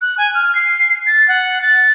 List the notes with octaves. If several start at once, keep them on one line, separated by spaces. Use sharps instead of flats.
F#6
G#5
F6
C7
A6
F#5
A6